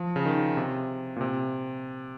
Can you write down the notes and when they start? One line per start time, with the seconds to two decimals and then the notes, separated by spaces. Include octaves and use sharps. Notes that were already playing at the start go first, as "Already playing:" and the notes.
Already playing: F3
0.16 C#3
0.25 D#3
0.57 C3
1.16 A#2
1.21 C3